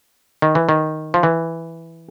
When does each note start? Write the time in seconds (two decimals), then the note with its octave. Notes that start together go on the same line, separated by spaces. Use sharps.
0.42 D#3
0.55 E3
0.69 D#3
1.14 F3
1.23 E3